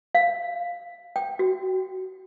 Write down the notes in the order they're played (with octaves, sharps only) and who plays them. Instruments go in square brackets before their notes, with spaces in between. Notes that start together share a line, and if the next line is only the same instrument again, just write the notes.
[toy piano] F5
G5
F#4